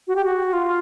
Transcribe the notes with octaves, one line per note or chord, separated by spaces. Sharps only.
F#4
G4
F#4
F4